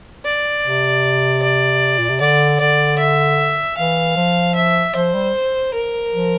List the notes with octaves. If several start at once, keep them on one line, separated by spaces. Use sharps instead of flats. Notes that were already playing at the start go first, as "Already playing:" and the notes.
D5
C3
D5
A#2
C3
D3 D5
D3 D5
E5
E3 F5
F3
E5
F3 C5
G3
A#4
F3